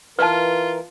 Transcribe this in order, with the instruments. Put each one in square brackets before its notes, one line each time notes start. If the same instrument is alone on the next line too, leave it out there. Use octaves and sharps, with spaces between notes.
[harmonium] E3 A#4 [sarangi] F4 [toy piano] B4 A5